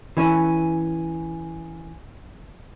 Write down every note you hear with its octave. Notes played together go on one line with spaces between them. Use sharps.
E3 C#4